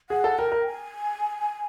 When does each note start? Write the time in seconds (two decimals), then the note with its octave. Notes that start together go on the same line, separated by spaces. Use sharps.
0.10 G#4 F#5
0.24 A4
0.38 A#4 G5
0.52 A#4
0.67 G#5